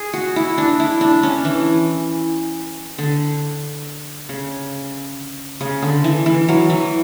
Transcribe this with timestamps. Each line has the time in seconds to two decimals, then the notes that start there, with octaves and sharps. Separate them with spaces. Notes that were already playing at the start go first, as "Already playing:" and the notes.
Already playing: G#4
0.13 F#4
0.36 E4
0.58 D4
0.80 E4
1.01 D4
1.23 C#4
1.45 E3
2.98 D3
4.29 C#3
5.61 C#3
5.82 D3
6.04 E3
6.26 E3
6.48 F#3
6.70 E3